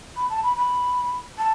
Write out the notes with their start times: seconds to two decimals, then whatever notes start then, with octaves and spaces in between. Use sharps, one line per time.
0.16 B5
0.30 A5
0.43 B5
0.56 B5
1.38 A5